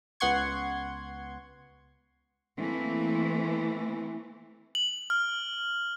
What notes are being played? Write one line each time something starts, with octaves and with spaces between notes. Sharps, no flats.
C#2 B3 F#5 C6 C#6 G#6
E3 A3 A#3 C4
F#7
F6